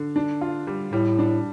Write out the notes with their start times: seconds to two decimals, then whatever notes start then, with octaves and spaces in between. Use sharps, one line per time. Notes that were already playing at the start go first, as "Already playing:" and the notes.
Already playing: D3
0.16 D4
0.41 F4
0.67 G3
0.93 A2 G3
1.19 D4